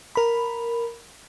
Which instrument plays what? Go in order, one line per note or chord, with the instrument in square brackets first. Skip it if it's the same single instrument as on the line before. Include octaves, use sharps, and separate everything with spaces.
[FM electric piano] A#4 B5